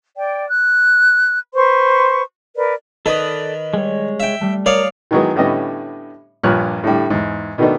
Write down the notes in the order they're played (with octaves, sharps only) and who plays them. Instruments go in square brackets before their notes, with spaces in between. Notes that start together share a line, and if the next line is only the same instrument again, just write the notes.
[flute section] D5 G5
F#6
B4 C5 C6 C#6
A#4 B4 D5
[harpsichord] D#3 B4 [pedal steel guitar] A4 D5 D#6
[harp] G3 [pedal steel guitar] G#3 C#5
[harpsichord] E5 G5
[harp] G3 A3
[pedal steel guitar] A#4 [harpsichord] C#5 D5 F5 [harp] D#6
[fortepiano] D#3 E3 F#3 G#3 B3 G#4
A2 D3 G3 B3 C#4 D#5
A#1 G2 A#2 C#5 F6 F#6
A2 D3 G3
E2 G#2
B2 D#3 A3 B3 D4 D#4